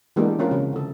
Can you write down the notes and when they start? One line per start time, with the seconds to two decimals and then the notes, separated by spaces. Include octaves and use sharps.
0.16 E3 G#3 A#3 B3 D4 G4
0.39 C4 C#4 F4 A#4
0.51 C#3 F3
0.73 D3 A4